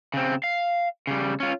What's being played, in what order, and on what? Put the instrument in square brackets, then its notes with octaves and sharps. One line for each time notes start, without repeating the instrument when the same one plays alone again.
[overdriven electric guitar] C#3 C4
F5
C#3 G3
C#4 F4